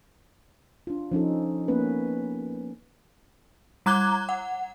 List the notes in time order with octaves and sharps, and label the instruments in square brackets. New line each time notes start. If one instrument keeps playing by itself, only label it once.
[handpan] D4 F4
F3 C#4 D#4 A4
A#3 B3 C#4 B4
[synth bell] G3 A#5 D6 F#6 G#6 G7
F#5